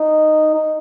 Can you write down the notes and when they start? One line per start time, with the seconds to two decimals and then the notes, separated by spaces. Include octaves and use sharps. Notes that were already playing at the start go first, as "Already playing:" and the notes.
Already playing: D#4
0.55 D#4